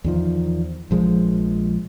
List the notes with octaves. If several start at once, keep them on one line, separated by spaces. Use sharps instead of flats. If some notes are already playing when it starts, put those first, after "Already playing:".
E2 D#3 F3
A#1 F3 G#3